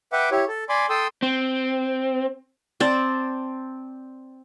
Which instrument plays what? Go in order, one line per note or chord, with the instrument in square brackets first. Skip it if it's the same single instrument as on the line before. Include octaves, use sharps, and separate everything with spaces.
[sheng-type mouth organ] B4 E5 F#5 G5 D6
E4 G4 C#5
A4
D5 G#5 B5 C6 D6
A4 G5 C6 D#6 E6
[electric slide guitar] C4
[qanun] C4 D5 A5